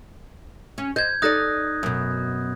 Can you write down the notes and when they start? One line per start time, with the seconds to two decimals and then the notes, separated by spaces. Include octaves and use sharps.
0.78 C#4
0.96 C5 D#5 G6 G#6
1.22 D#4 A4 D5 D#6 F#6 A#6
1.83 F#2 B2